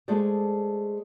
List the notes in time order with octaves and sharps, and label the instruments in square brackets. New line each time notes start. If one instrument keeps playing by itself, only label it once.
[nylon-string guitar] G#3 A3 G#4 A4 C5 D5